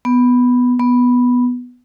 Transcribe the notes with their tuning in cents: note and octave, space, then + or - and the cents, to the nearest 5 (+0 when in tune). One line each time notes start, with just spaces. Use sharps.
B3 +0
B3 -5